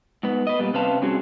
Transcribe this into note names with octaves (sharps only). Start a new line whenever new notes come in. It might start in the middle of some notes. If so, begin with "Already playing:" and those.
G#2 B3
B4 D#5
A#2 G3 B3
C3 C#4 B4 C5 F5 A5
G3 C4 C#4 F#4 G#4